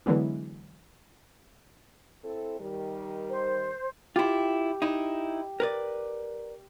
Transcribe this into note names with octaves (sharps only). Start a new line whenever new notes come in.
D3 E3 F#3 G#3 B3 C#4
C4 E4 A4
D#3 G3
C5
E4 F4 G4
D#4 E4
A#4 B4 D5